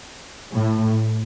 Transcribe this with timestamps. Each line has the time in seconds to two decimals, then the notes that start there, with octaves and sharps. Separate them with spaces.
0.52 A2